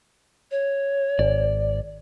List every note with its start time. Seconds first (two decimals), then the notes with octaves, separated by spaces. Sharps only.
0.51 C#5
1.19 G#1 D5